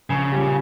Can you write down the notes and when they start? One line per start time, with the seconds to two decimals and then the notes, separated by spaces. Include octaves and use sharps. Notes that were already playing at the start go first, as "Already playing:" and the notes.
0.10 A#1 C#3
0.32 A#2 G3 C#4 G4